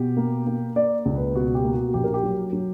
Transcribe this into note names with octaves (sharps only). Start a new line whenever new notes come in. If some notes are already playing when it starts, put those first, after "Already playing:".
Already playing: B2 G4
A#3
A#3
A#3 D5
C#2
B4
B2 F#4
G4
A#3
F#4
A#1 G4
A#4
G4
F#3
F#3